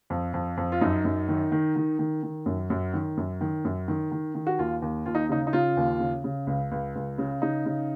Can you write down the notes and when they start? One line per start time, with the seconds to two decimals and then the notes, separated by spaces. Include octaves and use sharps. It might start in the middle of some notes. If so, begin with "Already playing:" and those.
0.10 F2
0.34 F2
0.57 F2
0.72 F4
0.81 F#2 D#4
1.05 F#2
1.29 D#3
1.52 D#3
1.76 D#3
1.99 D#3
2.23 D#3
2.46 F#2
2.70 F#2
2.94 D#3
3.17 F#2
3.41 D#3
3.65 F#2
3.88 D#3
4.12 D#3
4.35 D#3
4.47 F#4
4.59 D#2 F4
4.82 D#2
5.06 D#2 F4
5.15 D#4
5.29 C#3 D#4
5.47 D#4
5.53 C#3 F4
5.77 D#2
6.00 C#3
6.24 C#3
6.47 C#2
6.71 C#2
6.95 C#2
7.18 C#3
7.42 C#3 D#4
7.66 C#3